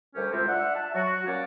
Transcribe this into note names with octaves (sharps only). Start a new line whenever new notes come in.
D2 G3 C#4 G4 A#4
C3 G#3 C4 E4 F4
D4 E5 F#5
E5 A5
F#3 F#4
A#3 C#4 C#5 D5 F#5